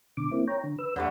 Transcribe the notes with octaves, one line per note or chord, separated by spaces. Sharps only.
B2 D3 D6
A#3 C4 E4
C#5 G5 A#5
D3
B4 E6
E2 D3 G3 A3